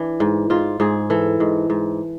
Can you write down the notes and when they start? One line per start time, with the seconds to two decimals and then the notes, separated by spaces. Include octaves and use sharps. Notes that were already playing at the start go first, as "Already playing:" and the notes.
Already playing: E3 D4
0.20 G#2
0.50 G#2 F4
0.80 G#2 G#4
1.10 E3 A4
1.40 G#2
1.70 G#2